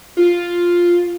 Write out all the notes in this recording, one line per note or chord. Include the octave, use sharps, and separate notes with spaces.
F4